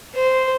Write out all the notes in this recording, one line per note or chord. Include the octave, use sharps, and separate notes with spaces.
C5